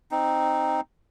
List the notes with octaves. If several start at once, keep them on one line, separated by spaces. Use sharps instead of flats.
C4 D#4